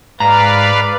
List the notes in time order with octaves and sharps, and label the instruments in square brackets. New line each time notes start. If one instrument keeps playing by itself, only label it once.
[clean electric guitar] G#2 A#5 [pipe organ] B4 D5 F5